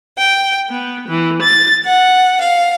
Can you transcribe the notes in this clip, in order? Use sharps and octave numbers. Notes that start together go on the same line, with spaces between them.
G5
B3
E3
A6
F#5
F5